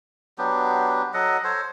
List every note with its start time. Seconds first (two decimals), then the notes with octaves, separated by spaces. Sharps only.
0.38 F#3 B3 D4 G4
1.14 F#3 A4 D#5 F#5
1.44 A4 C5 C#5